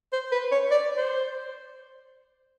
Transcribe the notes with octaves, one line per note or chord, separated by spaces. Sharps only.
C5
B4
C#5
D5
C5